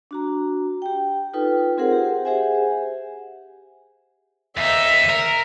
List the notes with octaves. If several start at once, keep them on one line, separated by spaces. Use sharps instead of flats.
D4 F#4 A#5
G4 G5
D#4 F4 A4 B4 G5
C4 F4 G#4 A#4 C5 F#5
G4 F#5
G4 G#4 C5 E5 F#5 G#5
D#2 D#4 E5
A#4